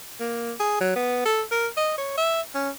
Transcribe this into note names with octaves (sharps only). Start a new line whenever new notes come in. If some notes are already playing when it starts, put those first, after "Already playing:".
A#3
G#4
F#3
B3
A4
A#4
D#5
C#5
E5
C#4